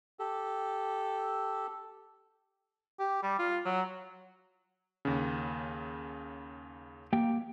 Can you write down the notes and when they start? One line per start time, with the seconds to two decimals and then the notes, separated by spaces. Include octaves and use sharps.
0.19 G4 A4
2.99 G4
3.23 G3
3.39 F4
3.65 F#3
5.05 D#2 C#3
7.13 A#3 G4 G5